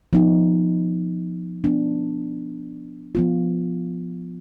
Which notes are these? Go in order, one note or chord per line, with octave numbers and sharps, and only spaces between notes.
F3 B3 D#4
F3 B3 D4
F3 B3 F4